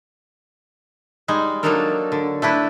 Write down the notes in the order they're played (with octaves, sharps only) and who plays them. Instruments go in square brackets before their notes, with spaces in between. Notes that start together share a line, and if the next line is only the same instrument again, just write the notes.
[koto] G3 G#3 D#4
F#3 A#3 D4 D#4 A4 A#4
D3
A3 D4 E4 B4